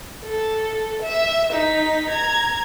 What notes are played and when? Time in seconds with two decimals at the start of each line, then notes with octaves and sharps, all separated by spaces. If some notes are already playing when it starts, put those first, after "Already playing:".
0.23 A4
1.02 E5
1.53 D#4 B6
2.10 A#5 G#6